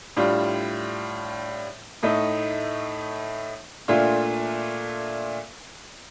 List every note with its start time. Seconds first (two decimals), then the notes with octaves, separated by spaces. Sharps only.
0.17 A2 G3 D4 F4
2.03 A2 A3 D#4
3.88 A#2 A3 D4 F4